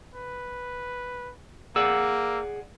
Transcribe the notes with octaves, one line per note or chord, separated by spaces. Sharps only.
B4
A#3 G#4 D5 F#5 E6